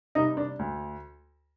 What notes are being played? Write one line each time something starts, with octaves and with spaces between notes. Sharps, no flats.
C3 G3 D#4
D4
D2